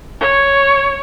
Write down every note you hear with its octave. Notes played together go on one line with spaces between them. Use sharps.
C#5